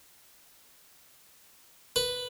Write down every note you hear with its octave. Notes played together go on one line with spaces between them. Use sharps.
B4